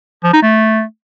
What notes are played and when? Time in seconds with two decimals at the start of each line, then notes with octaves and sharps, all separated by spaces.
0.24 F3
0.33 D#4
0.42 A3